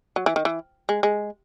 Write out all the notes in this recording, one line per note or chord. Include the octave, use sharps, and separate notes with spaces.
F#3
E3
D#3
E3
G#3
G#3